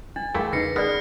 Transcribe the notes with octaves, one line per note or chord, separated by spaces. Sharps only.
D4 A6
E2 A3 E4 G#4 A#4 F5 G5
C#3 D#4 B4 A#6 C7 C#7
B3 G#4 A#4 D5 F6